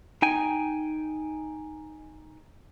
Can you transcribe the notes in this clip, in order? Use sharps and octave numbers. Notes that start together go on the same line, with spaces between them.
D#4 G5 G#5